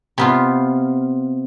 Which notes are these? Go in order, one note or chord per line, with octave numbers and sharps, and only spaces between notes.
C3 B3 F4